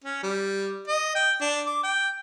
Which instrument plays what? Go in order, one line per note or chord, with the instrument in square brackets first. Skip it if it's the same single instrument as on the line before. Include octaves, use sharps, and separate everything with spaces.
[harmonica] C#4
G3
D#5
G5
D4
D6
G5